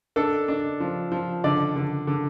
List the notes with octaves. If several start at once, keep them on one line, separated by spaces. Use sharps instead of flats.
D4 A4
D4
F3
F3
D3 D5
D3
D3